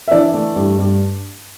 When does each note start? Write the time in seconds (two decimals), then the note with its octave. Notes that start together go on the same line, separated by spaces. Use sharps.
0.08 E5
0.11 E3 D4 D5
0.34 A3
0.56 G2
0.78 G2